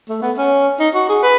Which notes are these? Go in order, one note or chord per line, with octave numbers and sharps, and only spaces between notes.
A3
B3
C#4
D#4
F#4
G#4
B4